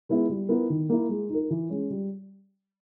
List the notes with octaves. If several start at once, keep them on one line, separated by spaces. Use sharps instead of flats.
G#3 B3 E4
G3
B3 E4 A#4
D#3
A#3 E4
G#3
D#4 A#4
E3
G#3 C#4
G3